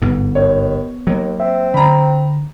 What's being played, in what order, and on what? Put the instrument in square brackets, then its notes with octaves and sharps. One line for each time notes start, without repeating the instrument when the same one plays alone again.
[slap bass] G1 G#2 [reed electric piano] B3
[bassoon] D#2 [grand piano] C#5
[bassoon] D#2 [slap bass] F#3 A#3
[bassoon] C4 [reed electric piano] E5
[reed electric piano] D3 [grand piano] A#5 B5